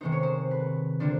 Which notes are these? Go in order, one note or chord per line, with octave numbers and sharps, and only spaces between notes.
C3 D#3 G#3 B3 D#4 C5
C#5
C5
B4
D3 G3 A#3 D4 F4 C5